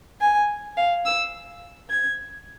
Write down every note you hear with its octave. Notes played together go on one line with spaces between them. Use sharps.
G#5
F5
E6
G#6